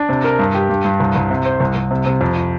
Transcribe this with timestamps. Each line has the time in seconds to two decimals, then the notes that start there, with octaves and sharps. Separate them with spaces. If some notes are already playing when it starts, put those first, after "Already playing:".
Already playing: D4
0.09 C3
0.24 A#4
0.39 G2
0.55 G4
0.69 G2
0.85 G2
1.00 C2
1.16 C2
1.30 C3
1.45 C5
1.60 C2
1.76 C2
1.91 C3
2.06 C3
2.21 F2